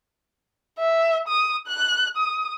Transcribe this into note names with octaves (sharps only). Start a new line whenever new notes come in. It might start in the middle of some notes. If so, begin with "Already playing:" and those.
E5
D#6
F#6
D#6